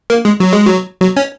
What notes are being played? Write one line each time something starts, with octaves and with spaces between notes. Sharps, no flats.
A#3
G#3
F#3
G#3
F#3
F#3
C#4